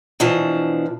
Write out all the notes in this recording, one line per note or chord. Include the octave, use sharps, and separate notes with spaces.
B2 E3 F3 D4